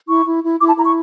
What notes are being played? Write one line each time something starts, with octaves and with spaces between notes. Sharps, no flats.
E4 C#6
E4
E4
E4 D6
A5
E4 A#5
C#6